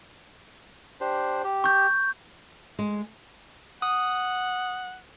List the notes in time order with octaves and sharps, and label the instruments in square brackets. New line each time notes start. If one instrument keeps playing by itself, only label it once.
[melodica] D4 G4 C5
G4
[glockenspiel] C#6 G6
[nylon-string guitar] G#3
[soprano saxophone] F#5 [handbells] D#6